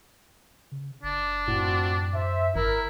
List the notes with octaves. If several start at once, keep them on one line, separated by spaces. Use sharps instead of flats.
C#3
F#1 D4
F#2 A2 C4 F4 F#4
C5 E5
G#1 E4 A#4